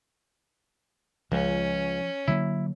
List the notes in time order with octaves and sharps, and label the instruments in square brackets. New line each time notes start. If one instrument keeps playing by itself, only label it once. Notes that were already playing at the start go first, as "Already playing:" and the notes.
[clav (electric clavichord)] C#2 [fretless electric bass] F3 [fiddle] C#4
[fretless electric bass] D3 F#3 A#3 [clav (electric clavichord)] E4